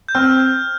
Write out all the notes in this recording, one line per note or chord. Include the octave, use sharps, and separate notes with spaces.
G6
C4 F6